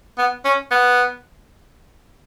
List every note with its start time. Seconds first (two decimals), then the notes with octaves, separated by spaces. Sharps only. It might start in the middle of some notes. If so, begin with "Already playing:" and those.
0.18 B3
0.45 C#4
0.71 B3